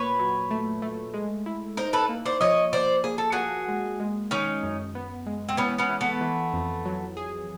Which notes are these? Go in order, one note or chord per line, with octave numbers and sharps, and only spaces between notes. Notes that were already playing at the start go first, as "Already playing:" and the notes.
Already playing: A#2 B4 C#5
F#3
A3
A3
G#3
E4
D#4 A#4 C5
A4 B4
A#3
C5 D5
F3 C#5 D#5
F3 C5 D5
A#3 G#4
A4
A#3 F#4 G#4
G#3
G#3
D#3 C#4 D#4
F#2
B3
G#3
C4
E3 B3 C#4
B3 C#4
E3
A3 B3
E3
F2
F#3
G#4